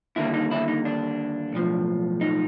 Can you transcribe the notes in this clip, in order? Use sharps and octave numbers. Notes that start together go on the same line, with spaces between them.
D#2 D3 G3 A#3 E4
D#4
E4
D#4
D4
B1 A2 F3
D#4